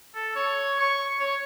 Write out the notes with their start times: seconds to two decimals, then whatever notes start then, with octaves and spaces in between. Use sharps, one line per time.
0.15 A4
0.36 C#5
0.80 C#6
1.20 C#5